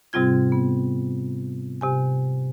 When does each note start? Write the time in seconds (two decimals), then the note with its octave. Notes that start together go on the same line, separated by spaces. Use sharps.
0.13 G#2 C3 G3 C4 F4 G#6
0.52 B3
1.81 C3 G4 G#5